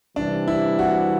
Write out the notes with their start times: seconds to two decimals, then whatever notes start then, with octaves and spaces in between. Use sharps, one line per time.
0.16 C3 E3 G3 D4
0.48 E4
0.79 F#4